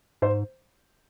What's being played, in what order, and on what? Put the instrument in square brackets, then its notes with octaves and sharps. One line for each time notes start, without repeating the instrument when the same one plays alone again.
[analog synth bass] G#2 [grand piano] C5